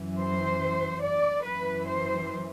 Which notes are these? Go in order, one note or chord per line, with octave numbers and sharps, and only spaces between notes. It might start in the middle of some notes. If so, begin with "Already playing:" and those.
Already playing: F#2 E3
C5
D5
F#2 E3 B4
C5